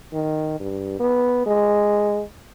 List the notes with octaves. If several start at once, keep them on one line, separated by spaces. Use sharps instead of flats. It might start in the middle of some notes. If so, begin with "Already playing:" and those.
D#3
G2
B3
G#3